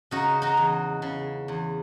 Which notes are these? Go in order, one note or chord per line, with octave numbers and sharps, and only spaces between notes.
C#3 D#4 F#4
D#4 F#4
E2
C#3
E2